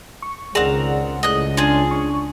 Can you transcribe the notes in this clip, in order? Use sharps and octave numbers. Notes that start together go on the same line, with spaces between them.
C#6
C#2 D#3 C4 G#4 A#4 D5 F#5
C#2 A2 D#5 F#6
D4 F4 G#4
D4 C#6